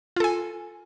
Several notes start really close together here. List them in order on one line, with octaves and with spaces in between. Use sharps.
F4 A4 G#5